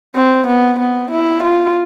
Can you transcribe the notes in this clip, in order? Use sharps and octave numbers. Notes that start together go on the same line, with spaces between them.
C4
B3
B3
E4
F4